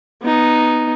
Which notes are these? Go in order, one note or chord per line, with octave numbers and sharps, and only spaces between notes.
B3 D#4